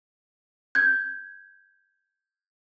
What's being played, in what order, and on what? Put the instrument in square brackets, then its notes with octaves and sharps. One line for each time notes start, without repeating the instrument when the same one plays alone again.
[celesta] G6 G#6